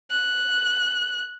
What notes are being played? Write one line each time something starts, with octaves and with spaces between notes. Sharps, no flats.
F#6